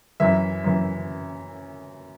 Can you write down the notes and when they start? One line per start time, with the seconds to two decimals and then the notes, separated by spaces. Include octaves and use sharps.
0.20 F#2 E3 E5
0.64 F#2 E3